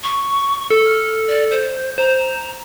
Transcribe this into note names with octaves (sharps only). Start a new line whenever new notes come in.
C#6
A4
F6
D5
C5
C5 A#5